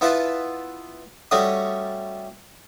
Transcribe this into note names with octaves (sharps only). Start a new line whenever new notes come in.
B3 E4 F4 B4 A5
G3 A3 C#4 F#4 D#6